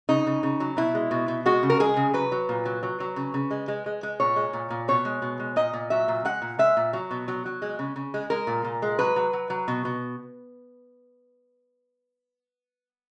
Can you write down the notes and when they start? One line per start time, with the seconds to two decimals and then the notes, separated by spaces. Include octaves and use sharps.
0.09 C#3 D#4
0.26 C#3
0.43 C#3
0.60 F#3
0.77 B2 E4
0.95 G#3
1.11 B2
1.28 B2
1.46 G#3 F#4
1.63 C#3
1.70 A#4
1.80 G#3 G#4
1.96 C#3
2.14 F#3 B4
2.32 F#3
2.49 A#2
2.65 F#3
2.83 F#3
3.00 F#3
3.16 C#3
3.34 C#3
3.51 G#3
3.68 G#3
3.86 G#3
4.03 G#3
4.20 A#2 C#5
4.36 G#3
4.53 A#2
4.70 A#2
4.88 B2 C#5
5.05 G#3
5.22 B2
5.39 G#3
5.56 A#2 D#5
5.73 A#2
5.90 F#3 E5
6.08 A#2
6.25 G#3 F#5
6.42 A#2
6.59 G#3 E5
6.77 A#2
6.93 F#3
7.11 B2
7.28 F#3
7.46 F#3
7.62 G#3
7.79 C#3
7.96 C#3
8.14 G#3
8.30 G#3 A#4
8.47 A#2
8.64 A#2
8.82 G#3
8.99 F#3 B4
9.16 F#3
9.33 F#3
9.50 F#3
9.68 B2
9.85 B2